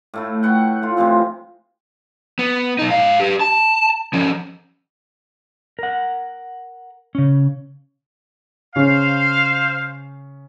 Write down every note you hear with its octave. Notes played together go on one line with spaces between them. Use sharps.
A2 A3 E4
B4 F#5 G5
A3 F4
C3 E3 F3 C4
B3
B2 D#4
G#2 F5
G4 B4
A5
F3 C#4
A#4 F#5
C#3 C#4
C#3 C#4 C5 F5